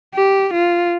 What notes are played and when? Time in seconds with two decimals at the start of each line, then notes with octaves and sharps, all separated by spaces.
0.14 G4
0.53 F4